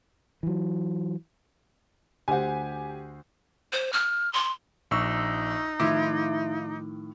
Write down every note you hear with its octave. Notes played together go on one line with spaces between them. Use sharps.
E3 F#3
D2 G4 C5 F#5 G#5
C5
F6
C6
A#1 D#4 C#6 E6
A2 D#3 F3 E4 F4 D6